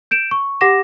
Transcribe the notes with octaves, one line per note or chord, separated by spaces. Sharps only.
G6 D7 E7
C#6
G4 F#5 D6 A#6 E7